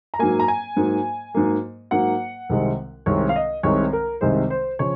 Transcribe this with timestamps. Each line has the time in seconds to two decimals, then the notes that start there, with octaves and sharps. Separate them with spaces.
0.14 A#5
0.19 G#2 F#3 A#3 G#5
0.39 A#5
0.48 G#5
0.76 G#2 F#3 A#3
1.34 G#2 F#3 A#3
1.91 G#2 F#3 A#3 F#5
2.49 C2 C3 D#3 G#3 C4
3.06 C2 C3 D#3 G#3 C4 C#5
3.29 F5
3.36 D#5
3.63 C2 C3 D#3 G#3 C4 C#5
3.93 A#4
4.21 C2 C3 D#3 G#3 C4 C5
4.50 C5
4.79 C#3 F3 C#5